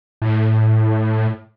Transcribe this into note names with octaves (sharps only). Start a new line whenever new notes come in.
A2